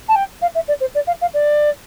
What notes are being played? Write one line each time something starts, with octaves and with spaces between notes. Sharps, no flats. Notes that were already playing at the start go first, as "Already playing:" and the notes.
A5
G5
F5
E5
D5
C5
D5
F5
F5
D5